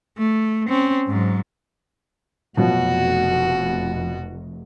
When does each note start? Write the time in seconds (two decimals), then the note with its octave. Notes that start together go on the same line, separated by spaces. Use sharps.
0.17 A3
0.69 C4 C#4
1.07 G#2 F#3
2.57 F1 B2 F3 F#3 F#4